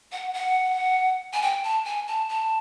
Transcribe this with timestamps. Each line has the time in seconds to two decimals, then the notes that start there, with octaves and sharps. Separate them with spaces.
0.12 F#5
0.34 F#5
1.33 G#5
1.42 G5
1.64 A5
1.85 G#5
2.08 A5
2.29 A5